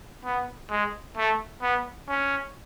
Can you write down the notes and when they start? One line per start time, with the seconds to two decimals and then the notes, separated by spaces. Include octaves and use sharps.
0.25 B3
0.71 G#3
1.17 A3
1.62 B3
2.09 C#4